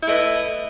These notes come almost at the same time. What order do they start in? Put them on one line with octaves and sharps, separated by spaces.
E4 A3 D#5 B4